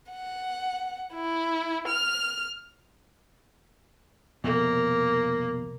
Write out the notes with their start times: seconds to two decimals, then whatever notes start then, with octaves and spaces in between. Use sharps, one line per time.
0.11 F#5
1.13 E4
1.88 F6
4.44 C2 F2 B2 A#3